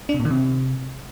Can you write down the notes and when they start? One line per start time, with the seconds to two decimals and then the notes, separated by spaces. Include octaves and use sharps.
0.09 D4
0.14 C3
0.20 A#2
0.25 D#3
0.30 C3